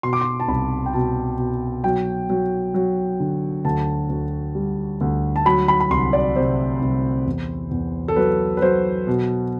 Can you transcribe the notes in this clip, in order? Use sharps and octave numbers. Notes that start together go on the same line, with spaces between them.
B2 C6
D6
C6
A5
C2 B5
G5
B2 A5
B2
F#3 G5
F#3
F#3
D3
D2 A5
D2
G3
D2
A5
F#3 B5
B5
B5
C2 C6
D5
C3 C5
C2
E2
E2
A4
F#3 B4
B4
F#3 C5
B2